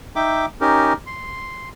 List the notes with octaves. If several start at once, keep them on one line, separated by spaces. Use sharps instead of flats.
D#4 E5 G5 D6
C#4 D#4 G4 A#4
C6